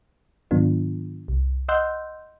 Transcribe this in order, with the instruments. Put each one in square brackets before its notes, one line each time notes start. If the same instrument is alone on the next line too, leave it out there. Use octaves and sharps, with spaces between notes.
[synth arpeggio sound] G#2 D#3 F#3 B3 D4 F4
C2
D#5 F#5 C6 E6 F#6 G6